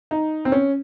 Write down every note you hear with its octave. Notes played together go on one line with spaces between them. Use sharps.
D#4
C4
C#4